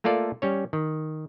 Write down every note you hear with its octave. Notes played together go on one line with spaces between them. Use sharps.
A3 A#3 F4 A4 D5
G3 C#4 C#5
D#3